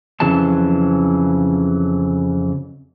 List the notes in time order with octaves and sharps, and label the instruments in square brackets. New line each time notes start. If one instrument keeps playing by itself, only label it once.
[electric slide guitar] F2 C#3 E3 F#3 A5